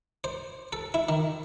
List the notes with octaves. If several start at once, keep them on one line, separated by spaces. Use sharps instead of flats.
C5
A4
E4
D#3